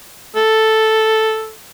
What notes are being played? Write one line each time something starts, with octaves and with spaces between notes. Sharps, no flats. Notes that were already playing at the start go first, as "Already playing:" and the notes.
A4